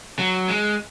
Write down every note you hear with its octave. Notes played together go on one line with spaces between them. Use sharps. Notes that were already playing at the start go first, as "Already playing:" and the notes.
F#3
G#3